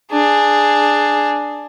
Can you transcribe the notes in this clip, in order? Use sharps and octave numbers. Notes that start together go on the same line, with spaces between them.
D4 G#4